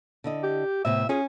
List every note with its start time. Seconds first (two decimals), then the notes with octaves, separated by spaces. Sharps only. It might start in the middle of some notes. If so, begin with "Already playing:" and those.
0.24 D3 E4 D#5
0.43 G4
0.85 A2 C3 B3 E5
1.09 C#4 F4 G#4